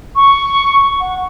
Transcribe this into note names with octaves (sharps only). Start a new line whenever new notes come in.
C#6
F#5